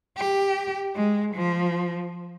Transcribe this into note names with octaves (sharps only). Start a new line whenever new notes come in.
G4
G#3
F3